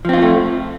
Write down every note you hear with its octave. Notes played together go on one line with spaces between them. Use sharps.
F3 A3 A#3 C4 F4